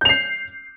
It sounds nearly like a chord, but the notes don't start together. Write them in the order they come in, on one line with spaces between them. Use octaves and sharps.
G6 F7 C7